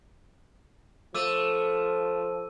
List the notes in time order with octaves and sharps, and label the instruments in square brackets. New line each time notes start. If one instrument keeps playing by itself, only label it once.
[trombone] F3 [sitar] A3 [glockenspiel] D6 E6 D#7